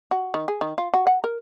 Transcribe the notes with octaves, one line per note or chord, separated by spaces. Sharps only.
F#4
D#3
G#4
D#3
F4
F#4
F#5
A#4